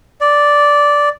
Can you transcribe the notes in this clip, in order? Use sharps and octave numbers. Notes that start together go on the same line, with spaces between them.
D5